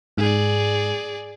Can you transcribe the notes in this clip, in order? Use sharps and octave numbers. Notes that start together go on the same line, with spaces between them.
G#2 G#4 D5